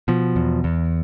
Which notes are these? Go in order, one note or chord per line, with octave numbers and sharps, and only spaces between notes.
B2 F3
E2
E2